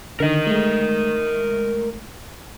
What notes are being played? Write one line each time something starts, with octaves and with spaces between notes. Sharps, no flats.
D3 D#3 A#4 D#5
G#3 A3